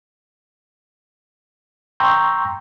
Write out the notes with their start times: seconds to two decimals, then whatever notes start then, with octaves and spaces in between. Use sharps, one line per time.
2.00 G5 A#5 C6 C#6 E6 G6